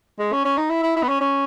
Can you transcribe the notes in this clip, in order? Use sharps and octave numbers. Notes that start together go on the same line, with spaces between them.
G#3
C#4
C#4
D#4
E4
E4
E4
B3
C#4
C#4